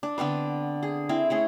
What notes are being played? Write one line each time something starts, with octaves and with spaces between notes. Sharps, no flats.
D4
D3 B3 C4 B4
G#4
C4 E4
A3 C#4 G#4